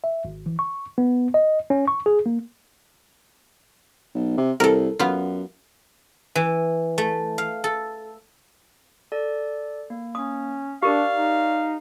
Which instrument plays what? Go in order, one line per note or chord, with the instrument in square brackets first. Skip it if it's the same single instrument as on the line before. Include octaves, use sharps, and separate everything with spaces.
[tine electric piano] E5
G#1
E3
C#6
B3
D#5
C#4
C#6
G#4
A#3
[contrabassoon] B1
C3
[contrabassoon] C2 [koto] A4 A#4
[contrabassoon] F#2 [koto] B3 F4
[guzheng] E3
A3
F5
A4
[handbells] A4 D5
A#3
[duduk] C#4 [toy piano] D#6
[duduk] D4 [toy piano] G4 A#4 [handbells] D5 C#6 [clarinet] F5
[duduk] D#4